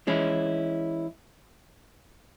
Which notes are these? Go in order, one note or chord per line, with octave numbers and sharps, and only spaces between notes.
E3 G#3 C#4 E4